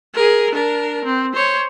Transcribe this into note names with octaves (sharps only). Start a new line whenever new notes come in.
G#4 A#4
D4 A#4
C4
C5 C#5